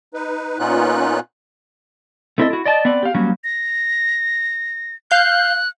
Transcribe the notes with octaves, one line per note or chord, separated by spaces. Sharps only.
D#4 B4
A#2 B3 C#4 D#4 F4 F#6
A3 C4 E4 F#4 A4 D#5
E4 F#4
D5 D#5 G5 A5
B3 C4 D5
G4 F5
F#3 G3 A#3 C#4 F#4
A#6
F5 F#6 G6